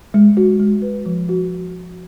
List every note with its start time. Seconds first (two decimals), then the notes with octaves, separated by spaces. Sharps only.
0.14 G#3
0.37 F#4
0.59 G#3
0.82 B4
1.06 F3
1.29 F#4